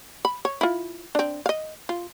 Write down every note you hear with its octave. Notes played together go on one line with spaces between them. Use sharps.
B5
C#5
E4 F4
C4 D4
D#5 F5
F4